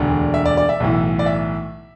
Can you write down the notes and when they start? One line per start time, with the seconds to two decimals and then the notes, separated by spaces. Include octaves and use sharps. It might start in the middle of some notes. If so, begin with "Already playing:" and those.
Already playing: E1 D2 D3
0.34 E5
0.46 D5
0.57 D5
0.69 E5
0.80 B1 A2 E3
1.19 D5
1.26 E5